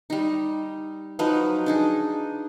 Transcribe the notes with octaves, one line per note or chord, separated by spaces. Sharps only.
G3 D#4
F3 F#3 D#4 B4
D4 D#4 G#4